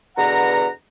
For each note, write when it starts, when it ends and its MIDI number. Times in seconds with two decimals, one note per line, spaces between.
0.17 0.67 40
0.17 0.67 47
0.17 0.67 50
0.17 0.67 71
0.17 0.67 78
0.17 0.67 82